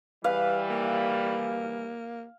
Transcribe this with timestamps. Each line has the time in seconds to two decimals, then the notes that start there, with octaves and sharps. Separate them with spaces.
0.24 E3 G3 B4 F5
0.70 A#3